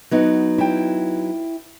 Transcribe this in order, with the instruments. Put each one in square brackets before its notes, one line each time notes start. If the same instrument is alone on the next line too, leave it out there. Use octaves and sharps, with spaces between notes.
[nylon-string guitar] F#3 B3 D#4
[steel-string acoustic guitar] E4 G5